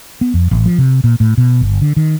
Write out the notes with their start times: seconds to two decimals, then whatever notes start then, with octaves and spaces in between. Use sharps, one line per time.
0.21 B3
0.34 F2
0.51 A1
0.66 F3
0.78 C3
1.04 A#2
1.20 A2
1.37 B2
1.61 G1
1.81 D3
1.96 D#3